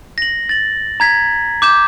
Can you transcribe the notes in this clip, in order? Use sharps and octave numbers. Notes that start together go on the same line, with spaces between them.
A#6 F#7
A6 F#7
A#5 G#6 B6
D6 G6 E7